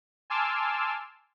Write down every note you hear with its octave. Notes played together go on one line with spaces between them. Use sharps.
G#5 A5 C6 D6 E6 F6